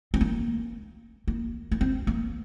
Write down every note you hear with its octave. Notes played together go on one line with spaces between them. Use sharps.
C4
A#3
A#3
A#3
C4
A#3